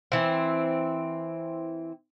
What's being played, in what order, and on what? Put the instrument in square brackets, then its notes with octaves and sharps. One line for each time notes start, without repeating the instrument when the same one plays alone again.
[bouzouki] E3 C4